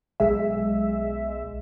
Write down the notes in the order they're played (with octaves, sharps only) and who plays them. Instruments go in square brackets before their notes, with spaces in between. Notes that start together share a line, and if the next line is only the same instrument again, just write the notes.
[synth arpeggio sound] B1 G#3 E5